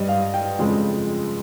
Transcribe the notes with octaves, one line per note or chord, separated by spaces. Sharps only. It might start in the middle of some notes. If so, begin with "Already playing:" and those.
Already playing: G2 G3 D#5
F5
G5
F2 C#3 F3 G#3